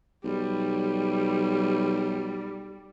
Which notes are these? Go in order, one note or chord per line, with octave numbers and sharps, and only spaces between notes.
B1 G3